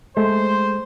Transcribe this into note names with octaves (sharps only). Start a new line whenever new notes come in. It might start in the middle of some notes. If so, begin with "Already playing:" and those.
G#3 A3 C5